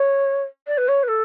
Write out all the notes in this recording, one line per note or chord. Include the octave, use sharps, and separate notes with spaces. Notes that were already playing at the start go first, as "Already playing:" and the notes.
Already playing: C#5
D5
B4
C#5
B4
A4